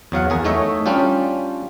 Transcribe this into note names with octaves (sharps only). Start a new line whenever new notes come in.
E2 F#3 F5 F#5
E2 G#4 A#4
A3 D#4 C#5 D#5 E5
G3 C#4 D4 F4 G4